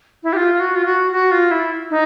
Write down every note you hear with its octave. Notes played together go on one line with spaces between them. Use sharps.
E4
G4
F4
F#4
F4
F#4
F#4
F4
E4
D#4